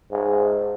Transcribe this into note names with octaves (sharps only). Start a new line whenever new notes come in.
G#2